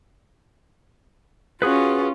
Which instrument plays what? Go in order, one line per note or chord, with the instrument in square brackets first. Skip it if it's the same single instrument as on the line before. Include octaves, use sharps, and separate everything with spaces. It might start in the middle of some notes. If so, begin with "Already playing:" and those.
[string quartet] C#4 F4 [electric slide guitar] F#4 G#4 B4